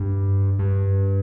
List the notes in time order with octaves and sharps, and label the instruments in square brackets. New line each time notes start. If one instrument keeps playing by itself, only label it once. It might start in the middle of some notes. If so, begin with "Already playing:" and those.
Already playing: [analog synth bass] G2
G2